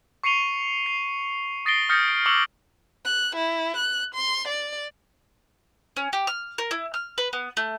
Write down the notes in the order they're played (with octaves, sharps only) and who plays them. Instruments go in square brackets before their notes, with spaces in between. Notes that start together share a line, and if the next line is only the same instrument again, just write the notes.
[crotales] C#6 C7 C#7 D#7 F7 G7
C7
D#6 A6 A#6 C7 D7 G7
D#6 F6 G6 A6 A#6 C#7
D7
C#6 D6 E6 C#7 F#7 G7
[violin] F#6
E4
F#6
C6
D5
[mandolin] C#4
G4
F6
A#4
E4
F6
B4
B3
A3